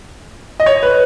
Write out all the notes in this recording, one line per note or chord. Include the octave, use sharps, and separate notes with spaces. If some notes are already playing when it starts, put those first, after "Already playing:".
D#5
C#5
B4